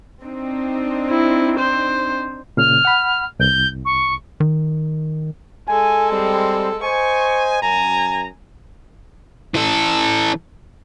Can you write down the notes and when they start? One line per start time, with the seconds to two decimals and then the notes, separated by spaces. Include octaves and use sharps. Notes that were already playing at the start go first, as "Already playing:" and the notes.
0.22 C4 D4 D#4
1.10 E4
1.59 C5
2.57 A#2 C#3 F6
2.85 F#5 B5
3.39 C2 G6
3.85 C#6
4.40 D#3
5.68 G#3 A4 G#5
6.11 G3 C4
6.83 C5 D#5 G#5 C#6
7.62 F#2 G#5 A#5
9.54 E3 A4